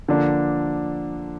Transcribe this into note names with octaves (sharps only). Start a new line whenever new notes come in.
D3 F3 A#3 D4